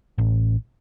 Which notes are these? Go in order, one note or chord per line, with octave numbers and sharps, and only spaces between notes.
A1